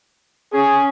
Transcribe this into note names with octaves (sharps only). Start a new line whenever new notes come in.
C#4 G#4